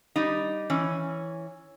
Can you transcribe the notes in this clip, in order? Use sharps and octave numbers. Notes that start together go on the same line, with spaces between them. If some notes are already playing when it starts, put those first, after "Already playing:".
G3 D#4
E3 C#4